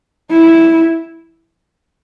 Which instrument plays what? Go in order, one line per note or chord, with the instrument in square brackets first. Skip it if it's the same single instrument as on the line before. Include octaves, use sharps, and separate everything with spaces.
[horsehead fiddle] E4